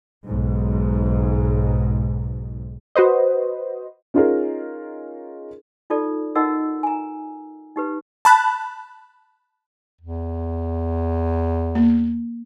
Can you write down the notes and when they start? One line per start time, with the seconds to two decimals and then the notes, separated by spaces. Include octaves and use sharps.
0.24 B1 G#2
2.95 F#4 B4 C5 D#5
4.14 C#4 D#4 F4 G#4 A#4
5.90 D#4 F4 A4 D5
6.35 D#4 F#4 A#4 D#5 F#5 E6
6.83 G#5 A#5
7.76 D#4 G4 B4
8.25 A5 B5 F#6
10.01 E2
11.75 A#3